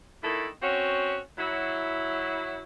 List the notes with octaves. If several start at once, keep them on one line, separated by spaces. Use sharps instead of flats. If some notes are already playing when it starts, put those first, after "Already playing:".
A#2 D#3 E4 A4
C4 C#4 F#4
F#3 E4